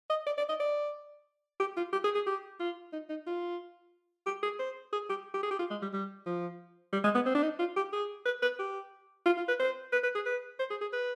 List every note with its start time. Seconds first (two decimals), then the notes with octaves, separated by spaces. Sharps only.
0.10 D#5
0.26 D5
0.38 D5
0.49 D#5
0.60 D5
1.60 G4
1.77 F4
1.93 G4
2.04 G#4
2.15 G#4
2.26 G4
2.60 F4
2.93 D#4
3.09 D#4
3.26 F4
4.26 G4
4.43 G#4
4.59 C5
4.92 G#4
5.09 G4
5.34 G4
5.43 G#4
5.51 G4
5.59 F4
5.71 G#3
5.82 G3
5.93 G3
6.26 F3
6.92 G3
7.04 G#3
7.15 B3
7.26 C4
7.35 D4
7.42 D#4
7.59 F4
7.76 G4
7.93 G#4
8.26 B4
8.42 B4
8.59 G4
9.25 F4
9.37 F4
9.48 B4
9.59 C5
9.92 B4
10.03 B4
10.15 G#4
10.26 B4
10.59 C5
10.70 G#4
10.81 G#4
10.93 B4